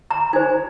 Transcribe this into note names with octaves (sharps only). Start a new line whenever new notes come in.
A#5
D#4 C5 G#5